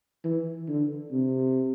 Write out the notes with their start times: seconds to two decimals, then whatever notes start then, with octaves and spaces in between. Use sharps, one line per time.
0.24 E3
0.68 D3
1.12 C3